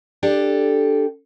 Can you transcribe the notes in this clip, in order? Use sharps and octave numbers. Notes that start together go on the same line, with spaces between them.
D4 G4 A4